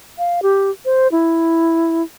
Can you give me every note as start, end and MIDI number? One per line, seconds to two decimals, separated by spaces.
0.18 0.40 77
0.43 0.70 67
0.85 1.08 72
1.12 2.03 64